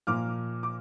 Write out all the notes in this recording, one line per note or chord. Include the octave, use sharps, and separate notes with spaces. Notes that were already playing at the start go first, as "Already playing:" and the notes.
A#2 F3 A#3 D6 F6
D6